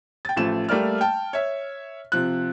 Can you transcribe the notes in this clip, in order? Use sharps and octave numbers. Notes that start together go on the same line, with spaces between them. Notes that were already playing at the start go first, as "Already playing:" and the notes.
G5 A6
A1 F3 A3 E7
G3 A3 A#3 D5 F6
G5 A5
C#5 E5
C3 F3 F#6